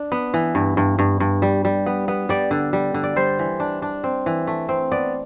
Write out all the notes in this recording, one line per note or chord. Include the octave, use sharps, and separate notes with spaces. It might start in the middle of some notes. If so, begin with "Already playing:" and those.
Already playing: D4
B3
E3
G2
G2
G2
G2
G3
G3
B3
B3
G3 D5
D3
G3
D3
D5
G3 C5
E3
D4
D4
C4
E3
A3
C4
B3 D5